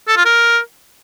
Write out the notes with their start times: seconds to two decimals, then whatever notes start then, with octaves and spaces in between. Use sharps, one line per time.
0.08 A4
0.16 F4
0.25 A#4